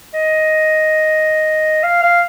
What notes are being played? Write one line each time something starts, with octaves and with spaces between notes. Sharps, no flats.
D#5
F5
F5